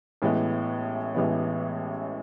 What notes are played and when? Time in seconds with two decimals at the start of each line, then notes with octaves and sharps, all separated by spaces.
0.22 A1 A2 E3 G#3 B3
1.15 A1 A2 E3 G#3 B3